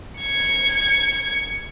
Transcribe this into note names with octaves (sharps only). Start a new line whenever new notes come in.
G#6 C#7